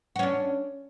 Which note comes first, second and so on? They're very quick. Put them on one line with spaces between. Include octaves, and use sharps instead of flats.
F#4 C#4 D4